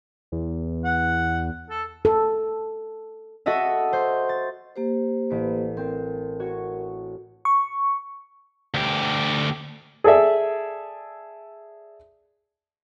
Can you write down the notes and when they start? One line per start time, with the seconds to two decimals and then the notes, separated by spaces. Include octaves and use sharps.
0.32 E2
0.85 F#5
1.70 A4
2.05 A4
3.46 F#4 A4 D#5 E5
3.93 C5
4.29 A6
4.76 A#3 G4 C5
5.30 A1 B6 D7
5.77 C4 A#4
6.40 F#4 C#5
7.45 C#6
8.74 D2 G4
10.04 G#4 A4 D5 E5